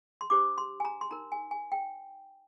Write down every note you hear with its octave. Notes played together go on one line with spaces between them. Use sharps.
C6
D4 G4 C5 D6
C6
G#5
A#5
C6
D#4 A#4 A#5
G#5
G#5
G5